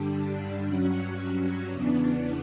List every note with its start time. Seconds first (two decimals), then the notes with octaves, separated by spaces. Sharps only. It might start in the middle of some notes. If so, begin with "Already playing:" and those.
Already playing: G2 D3 G3 D4
0.66 G2 F#3 C#4 F#4
1.72 E2 C#3 E3 B3 D4